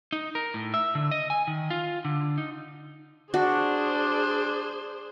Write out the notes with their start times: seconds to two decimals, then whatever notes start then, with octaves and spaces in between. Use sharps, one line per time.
0.13 D#4
0.35 A#4
0.54 A2
0.74 E5
0.95 D3
1.11 D#5
1.30 G#5
1.47 D#3
1.70 F4
2.05 D3
2.38 D#4
3.34 D4 F#4 G#4 C5